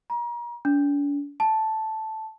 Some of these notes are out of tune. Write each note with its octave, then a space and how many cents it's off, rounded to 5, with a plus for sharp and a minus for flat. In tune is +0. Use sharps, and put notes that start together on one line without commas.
A#5 +35
D4 -45
A5 -5